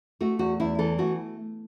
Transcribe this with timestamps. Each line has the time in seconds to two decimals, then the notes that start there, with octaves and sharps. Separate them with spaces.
0.21 A3 F#4
0.39 E2 F#4
0.60 E2 E4
0.79 E3 A4
0.98 A3 F#4